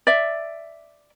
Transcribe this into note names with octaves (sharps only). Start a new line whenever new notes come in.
D5 E5